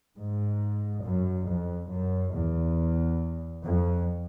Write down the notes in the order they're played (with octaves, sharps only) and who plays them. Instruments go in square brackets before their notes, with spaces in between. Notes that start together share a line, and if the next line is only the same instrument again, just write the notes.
[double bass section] G#2
F#2
F2
F#2
E2
F2